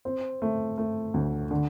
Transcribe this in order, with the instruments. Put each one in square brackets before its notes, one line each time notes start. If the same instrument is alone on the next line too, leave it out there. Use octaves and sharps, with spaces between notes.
[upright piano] C4
A3
A3
D2
D3